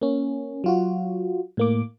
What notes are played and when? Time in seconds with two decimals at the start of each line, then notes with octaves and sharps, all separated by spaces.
0.01 A#3 C#4
0.64 F#3 F4 F#4
1.57 A2 A#3 D6